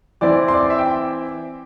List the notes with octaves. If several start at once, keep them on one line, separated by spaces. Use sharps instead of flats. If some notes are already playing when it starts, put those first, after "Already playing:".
E3 C4 E4 D5 D6
C6
D5 D6
E5
G5